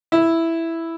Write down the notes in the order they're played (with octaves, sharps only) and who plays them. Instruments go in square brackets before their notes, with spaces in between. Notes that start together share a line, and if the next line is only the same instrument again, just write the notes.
[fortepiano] E4